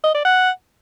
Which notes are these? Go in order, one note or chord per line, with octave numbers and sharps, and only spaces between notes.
D#5
D5
F#5